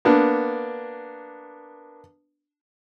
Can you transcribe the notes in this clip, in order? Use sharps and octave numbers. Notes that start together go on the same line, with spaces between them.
A#3 B3 D4